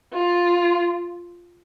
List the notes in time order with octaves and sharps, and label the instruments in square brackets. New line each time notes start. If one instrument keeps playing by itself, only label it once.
[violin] F4